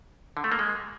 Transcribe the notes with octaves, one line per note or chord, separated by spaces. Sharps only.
D3
A3
A#3
G#3